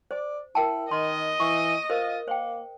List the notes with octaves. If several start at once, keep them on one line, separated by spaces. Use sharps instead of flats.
C5 D5
E4 A#4 G5 A5
D#3 D#5 C6
E3 C#6
F4 A#4 C5
A#3 C5 G5